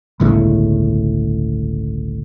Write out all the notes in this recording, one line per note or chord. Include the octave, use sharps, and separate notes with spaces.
G1 C#2 A2